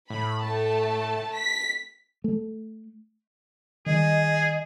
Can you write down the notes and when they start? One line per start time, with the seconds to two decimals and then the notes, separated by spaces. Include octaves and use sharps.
0.10 A2 B5
0.43 A3 A5
1.34 B6
2.24 A3
3.86 D#3 G3 G#4 D#5